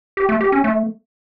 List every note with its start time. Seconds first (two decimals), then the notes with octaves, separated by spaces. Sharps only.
0.17 G4
0.29 A3
0.41 G4
0.52 C#4
0.64 A3